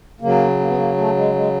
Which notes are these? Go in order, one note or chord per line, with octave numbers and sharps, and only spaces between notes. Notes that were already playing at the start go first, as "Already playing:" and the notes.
C#3 F#3 A#3
A#3
B3
A#3
A3
G#3
G#3